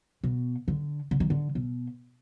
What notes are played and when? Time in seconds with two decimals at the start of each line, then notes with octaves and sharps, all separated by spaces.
0.23 B2
0.68 D3
1.11 D3
1.20 D#3
1.30 D3
1.55 B2